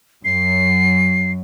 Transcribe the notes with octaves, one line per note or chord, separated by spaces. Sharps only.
F#2 F#3 C7